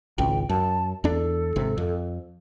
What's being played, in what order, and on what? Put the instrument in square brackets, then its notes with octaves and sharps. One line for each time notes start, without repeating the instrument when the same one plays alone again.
[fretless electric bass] G#1 C#2 [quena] G5
[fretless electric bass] F#2 [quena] A5
[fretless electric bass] E2 D4 [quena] A4
[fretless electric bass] G#1 C3
F2